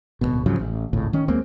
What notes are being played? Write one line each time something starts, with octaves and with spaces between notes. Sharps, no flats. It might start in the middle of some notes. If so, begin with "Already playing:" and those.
D1 G#1 B2
G#2 C#3 F3 F#3
A1
G#1 C#2 A2
D#3 C#4
D#2 G#3 A#3 C4